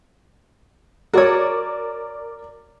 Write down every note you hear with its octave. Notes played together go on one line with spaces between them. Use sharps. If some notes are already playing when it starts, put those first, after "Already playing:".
F#4 A#4 C#5 D5 D6